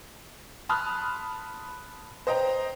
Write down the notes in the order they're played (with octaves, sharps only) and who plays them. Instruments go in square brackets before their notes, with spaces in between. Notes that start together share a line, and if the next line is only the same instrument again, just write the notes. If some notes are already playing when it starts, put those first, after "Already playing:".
[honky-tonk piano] A5 B5 C6 D#6 F6 F#6
C5 D#5 G5 A#5